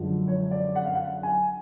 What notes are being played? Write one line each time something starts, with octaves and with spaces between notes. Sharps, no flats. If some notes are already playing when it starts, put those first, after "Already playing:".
Already playing: F#2 D3 F3 G#3
C#5
D5
F#5
F5
F#5
G#5